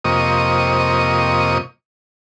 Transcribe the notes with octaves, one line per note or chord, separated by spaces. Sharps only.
F2 C3 A#3 D#5 C#6 D#6